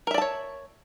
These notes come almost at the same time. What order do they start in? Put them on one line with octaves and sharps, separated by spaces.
A#4 E5 D5 A5 C#5